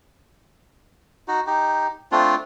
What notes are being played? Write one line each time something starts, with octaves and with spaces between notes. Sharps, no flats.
D#4 F#4
D#4 G4
A3 C4 D4 F4